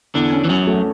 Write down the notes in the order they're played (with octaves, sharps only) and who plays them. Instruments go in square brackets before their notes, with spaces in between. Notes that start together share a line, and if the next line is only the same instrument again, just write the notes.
[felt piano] E2 [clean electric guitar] D3 D4
[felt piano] C#4
[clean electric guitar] E3
[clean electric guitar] F#2 F#3 [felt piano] C#4
[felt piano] A3